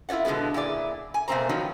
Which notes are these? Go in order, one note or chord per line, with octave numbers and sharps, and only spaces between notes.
E4 F4 C#5 D5 F#5
B2 D3 E3 G#3 B3
A#2 E4 G#4 D5
G#5
B2 A3 A#3 C4 C5 A#5
D#3 F3 F#3 B3 D#4